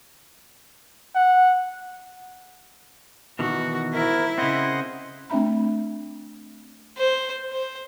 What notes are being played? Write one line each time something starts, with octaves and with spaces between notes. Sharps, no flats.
F#5
B2 D#3 E3 F#4
G#2 E4 A#4
C#3 C4 C5 D#5 F#5
A3 C4 D4 E5 A#5 B5
C5
C5